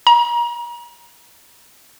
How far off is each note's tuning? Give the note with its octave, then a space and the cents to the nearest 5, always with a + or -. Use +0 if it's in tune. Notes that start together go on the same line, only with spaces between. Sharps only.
A#5 +35